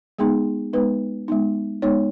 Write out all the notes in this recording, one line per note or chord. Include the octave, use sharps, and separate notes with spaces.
G#3 B3 D#4 G#4
G#3 B3 D#4 B4
G#3 B3 D#4
G#3 B3 D#4 C#5